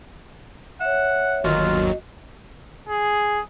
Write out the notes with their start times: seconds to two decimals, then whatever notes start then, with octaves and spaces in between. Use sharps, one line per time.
0.80 C#5 E5 F#5
1.44 G1 D#2 F#3 F4 F#4 D#5
2.89 G#4